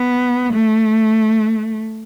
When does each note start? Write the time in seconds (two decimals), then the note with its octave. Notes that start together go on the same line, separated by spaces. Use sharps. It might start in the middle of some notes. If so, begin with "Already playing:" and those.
Already playing: B3
0.53 A3